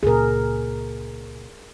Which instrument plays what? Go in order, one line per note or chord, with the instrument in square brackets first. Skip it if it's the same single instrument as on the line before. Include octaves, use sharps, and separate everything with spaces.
[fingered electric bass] C#2 A#2 [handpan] G#4 A#4